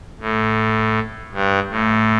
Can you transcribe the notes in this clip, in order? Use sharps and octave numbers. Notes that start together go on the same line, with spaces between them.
A2
G2
A2